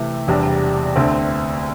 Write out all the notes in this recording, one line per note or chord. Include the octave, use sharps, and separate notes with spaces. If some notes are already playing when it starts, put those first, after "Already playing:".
Already playing: C3 E3 A3
E1 E2 C3 G3 D4
D2 D3 A3 C4